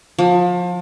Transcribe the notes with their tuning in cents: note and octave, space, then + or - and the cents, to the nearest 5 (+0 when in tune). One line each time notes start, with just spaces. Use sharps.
F3 +30